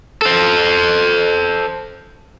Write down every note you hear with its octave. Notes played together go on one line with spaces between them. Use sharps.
A4 C5